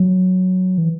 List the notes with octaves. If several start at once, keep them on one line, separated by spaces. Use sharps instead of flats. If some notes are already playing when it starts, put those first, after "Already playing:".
Already playing: F#3
E3